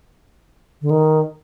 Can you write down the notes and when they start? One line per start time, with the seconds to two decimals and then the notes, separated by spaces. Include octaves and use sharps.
0.82 D3
0.90 D#3